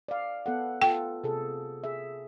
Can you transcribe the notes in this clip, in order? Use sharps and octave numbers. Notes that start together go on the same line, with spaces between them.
D5 F5
B3 A4 F#5
F4 A4 G5
C3 G#4 A4
G#4 E5